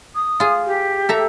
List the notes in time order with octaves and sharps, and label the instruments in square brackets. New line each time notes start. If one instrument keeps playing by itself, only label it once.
[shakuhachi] D#6
[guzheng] F4 G#4
[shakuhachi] G4
[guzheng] A4 E5 A#5